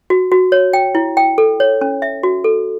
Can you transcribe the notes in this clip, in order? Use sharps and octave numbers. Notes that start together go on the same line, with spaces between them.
F#4
F#4
C#5
G5
E4
G5
A4
C#5
C#4
E5
F#4
A4